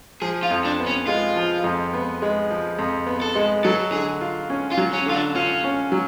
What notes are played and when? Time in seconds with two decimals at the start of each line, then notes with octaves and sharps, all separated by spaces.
0.22 F3 G#4
0.43 F4
0.51 F2
0.65 D4
0.79 B3
0.86 C#4
1.07 G#3 F4
1.36 F3
1.64 F2
1.94 B3
2.22 G#3
2.50 F3
2.79 F2
3.06 B3
3.22 A4
3.35 G#3
3.65 F#3 A4
3.92 D3 G#4
4.21 F4
4.50 C#4
4.72 F4
4.77 F#3
4.93 C#4
5.06 D3 F4
5.14 D4
5.35 C#4 F4
5.64 C#4
5.92 F#3